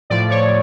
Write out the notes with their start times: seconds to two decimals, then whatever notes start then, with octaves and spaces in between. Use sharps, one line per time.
0.10 A2 F3 D5
0.31 C#5